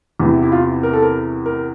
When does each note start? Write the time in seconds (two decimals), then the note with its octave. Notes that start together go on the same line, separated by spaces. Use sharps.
0.19 E2 C3 E3 E4
0.43 E4
0.52 F4
0.83 A#4
0.93 A4
1.02 A#4
1.46 A#4